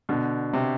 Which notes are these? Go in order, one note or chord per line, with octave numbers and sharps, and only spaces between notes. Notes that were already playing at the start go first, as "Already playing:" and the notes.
B2 D3
C3